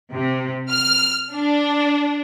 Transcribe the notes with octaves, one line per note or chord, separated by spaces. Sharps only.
C3
F6
D4